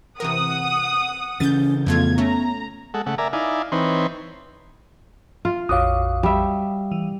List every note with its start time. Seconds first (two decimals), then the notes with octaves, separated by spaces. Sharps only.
0.20 C3 E3 A#4 F#5 D#6
1.40 C#3 E3 C#4 G6 A6
1.87 F2 A3 B3 F4 G#6
2.18 A3 C#4 A#5
2.94 G#3 A4 F#5
3.06 C#3 A3 F#5
3.18 A#4 D5 E5 G#5 A#5
3.33 D#4 E4 D5 F5 G#5
3.72 E3 C4 D#4 B4 C#5 C6
5.45 F4
5.69 A#1 F2 F#4 C#5 F5 D6 D#6
6.23 G3 E5
6.91 E3